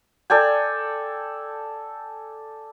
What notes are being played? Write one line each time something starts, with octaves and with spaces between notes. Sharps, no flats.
A4 D5 G5 G#5